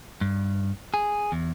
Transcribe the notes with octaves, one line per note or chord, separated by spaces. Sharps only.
G2
G#4
E2